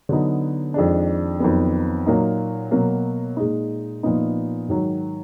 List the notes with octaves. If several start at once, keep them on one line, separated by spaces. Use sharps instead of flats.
D3 F#3 B3 D#4
F2 D#3 G#3 D4
F2 D#3 F#3 B3
A#2 F#3 A#3 D#4
B2 F#3 A#3
A#2 G#3 D#4
A#2 F3 B3 D#4
G#2 D#3 F#3